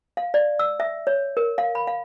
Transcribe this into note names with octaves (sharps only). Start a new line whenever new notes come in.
F5
D5
E6
E5
C#5
A#4
F5
B5
F5